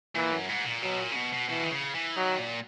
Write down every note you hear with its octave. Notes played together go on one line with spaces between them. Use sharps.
A#2 E3
F#2
G#2
A#2
B2 F#3
A#2
C#3
B2
B2
B2 E3
D#3
C#3
E3
D#3 F#3
A#2